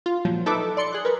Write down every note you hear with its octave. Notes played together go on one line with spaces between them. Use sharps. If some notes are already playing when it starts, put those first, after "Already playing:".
F4
A#2 F3 F#3
D#4 A4 B4 E5 D6
D5 C6 C#7
G#4 F#6
A#4 B4